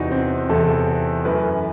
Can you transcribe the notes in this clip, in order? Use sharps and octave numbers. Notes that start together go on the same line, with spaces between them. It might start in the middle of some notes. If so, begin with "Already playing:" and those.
Already playing: E2 C3 E3 D#4 F#4
C4
E2 C3 E3 A4
F#2 E3 A3 B4